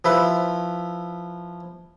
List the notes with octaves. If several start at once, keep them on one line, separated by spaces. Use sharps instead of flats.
F3 E4 B4